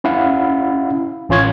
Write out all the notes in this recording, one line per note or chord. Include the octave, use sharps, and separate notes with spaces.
C#4 E4 F5 F#5
A1 C#4 F4 C#5 G#6